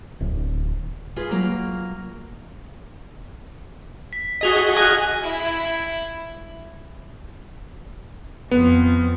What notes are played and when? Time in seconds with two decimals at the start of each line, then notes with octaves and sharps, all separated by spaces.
0.20 D1
1.16 F4 G#4 B4
1.31 F#3 A#3 F4 A#5
4.13 B6
4.41 F#4 G#4 D#5 B6 F7 G7
4.77 G#5 F6 F#6 A#6
5.23 E4
8.51 F2 B3